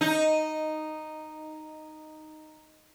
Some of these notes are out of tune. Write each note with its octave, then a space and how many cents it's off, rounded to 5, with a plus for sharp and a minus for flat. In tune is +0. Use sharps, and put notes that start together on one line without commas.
D#4 -5